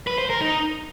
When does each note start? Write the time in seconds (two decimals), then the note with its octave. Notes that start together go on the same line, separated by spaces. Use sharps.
0.07 B4
0.18 C5
0.30 A#4
0.41 D#4